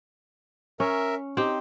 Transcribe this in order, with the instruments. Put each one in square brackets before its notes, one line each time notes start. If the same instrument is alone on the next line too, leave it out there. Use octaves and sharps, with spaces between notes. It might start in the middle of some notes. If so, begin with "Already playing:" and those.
[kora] C#4 [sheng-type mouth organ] A#4 E5
[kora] C4 G4 [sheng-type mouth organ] D#4